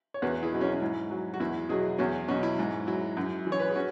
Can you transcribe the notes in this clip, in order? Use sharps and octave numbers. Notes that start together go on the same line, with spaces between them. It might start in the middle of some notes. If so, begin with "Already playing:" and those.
C#5
E2 F#4 B4
E4 G#4
B2 F#3
C#4 F#4
C#4
G#2 E4
F#3
F#4
E2 E4
B2 F#3 E4 G#4
E2 C#4 F#4
B2 F#3 C#4 F#4
E4
G#2
F#3 E4
F#2
E3
C#5
B4
G#4
C#4 F#4